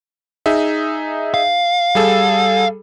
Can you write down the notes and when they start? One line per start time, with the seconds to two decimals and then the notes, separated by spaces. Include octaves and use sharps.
0.46 D#4 G#4 E5
1.34 F5
1.95 G3 G#4 A4